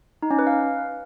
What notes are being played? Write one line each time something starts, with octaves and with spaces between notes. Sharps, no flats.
D#4
C#4
B4
F5